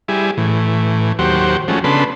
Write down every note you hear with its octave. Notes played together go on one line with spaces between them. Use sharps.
G3 E4 G#4
A2 E3
D#2 F#3 G4 C5 F#5
F3 G#3 A3 C#4 F#4
C#3 B3 D4 A4 B5 C6